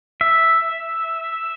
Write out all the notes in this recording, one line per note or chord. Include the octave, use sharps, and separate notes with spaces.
E5